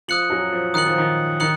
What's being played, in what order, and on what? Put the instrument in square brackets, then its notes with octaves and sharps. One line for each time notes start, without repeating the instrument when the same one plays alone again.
[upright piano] F3 [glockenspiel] D#6 F#6 C#7 F#7
[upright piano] F#2 F#3
F3
[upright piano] D#3 [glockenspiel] D#6 F#6 C#7 F#7
[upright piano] F3
D#3
[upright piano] D#3 [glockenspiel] D#6 F#6 C#7 F#7